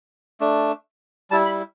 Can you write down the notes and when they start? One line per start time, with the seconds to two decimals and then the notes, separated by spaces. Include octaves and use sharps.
0.40 A3 D4
1.31 G3 E4 A5
1.45 B5